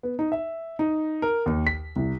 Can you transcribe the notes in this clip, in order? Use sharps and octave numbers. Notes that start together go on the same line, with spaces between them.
B3
D#4
E5
D#4
A#4
D#2
B6
C2